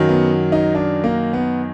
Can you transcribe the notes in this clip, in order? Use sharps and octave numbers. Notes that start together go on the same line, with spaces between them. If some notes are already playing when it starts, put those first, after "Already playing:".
Already playing: F#2 D#3 F#3
B3
D#4
D4
A#3
B3